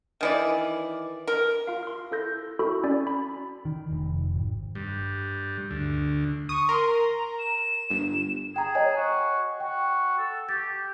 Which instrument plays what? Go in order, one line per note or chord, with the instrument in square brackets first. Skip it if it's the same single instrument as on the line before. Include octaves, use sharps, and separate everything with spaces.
[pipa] D#3 E3 D5
A#4
[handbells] F4 F5
C6 F6
E4 A4 G6 A#6
E4 F#4 A4 B5
C#4 D5
B5
[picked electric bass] D#3
F1
G#1
[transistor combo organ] G2
D2
[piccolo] C#6 [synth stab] D#6
[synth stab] A#4 [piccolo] C6
[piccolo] A#5
E7
[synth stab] G1
[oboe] G#4 [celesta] G5 A#5
[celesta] C#5 D#5 G#5
[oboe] F#4
[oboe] F#4 [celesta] G5
[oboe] A4
[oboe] G4 [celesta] A6